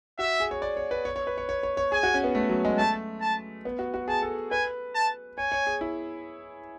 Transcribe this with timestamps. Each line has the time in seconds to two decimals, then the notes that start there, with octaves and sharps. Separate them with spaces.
0.19 F#4 E5
0.40 G#4
0.51 C#5
0.62 D5
0.77 C#5
0.91 B4
1.05 C#5
1.16 C#5
1.27 B4
1.38 C#5
1.49 C#5
1.63 C#5
1.77 C#5
1.92 G#4 G#5
2.03 F#4
2.14 C#4
2.24 B3
2.35 A3
2.49 F#3
2.65 G#3
2.78 A3 A5
3.21 A5
3.65 B3
3.79 F#4
3.94 F#4
4.08 G#4 A5
4.22 A4
4.51 B4 G#5
4.95 A5
5.38 C#5 G#5
5.52 C#5
5.67 G#4
5.81 E4